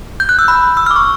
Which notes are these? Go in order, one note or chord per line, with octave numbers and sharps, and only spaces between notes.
G6
F#6
E6
B5
E6
F6
D6
C#6